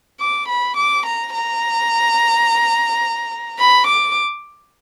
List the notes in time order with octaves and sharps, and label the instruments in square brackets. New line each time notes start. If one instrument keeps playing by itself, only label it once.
[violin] D6
B5
D6
A#5
A#5
B5
D6